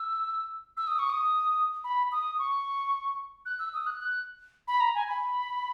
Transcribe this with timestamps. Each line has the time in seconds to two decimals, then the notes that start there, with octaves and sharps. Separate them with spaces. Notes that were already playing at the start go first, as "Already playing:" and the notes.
Already playing: E6
0.77 E6
0.87 D#6
0.99 C#6
1.09 D#6
1.84 B5
2.12 D#6
2.39 C#6
3.45 F#6
3.59 E6
3.74 D#6
3.86 F#6
4.00 F#6
4.68 B5
4.80 A#5
4.95 G#5
5.08 B5